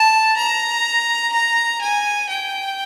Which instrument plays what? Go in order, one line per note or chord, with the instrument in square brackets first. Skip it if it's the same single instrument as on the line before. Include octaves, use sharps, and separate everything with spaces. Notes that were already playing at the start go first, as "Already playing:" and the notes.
Already playing: [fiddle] A5
A#5
A#5
G#5
G5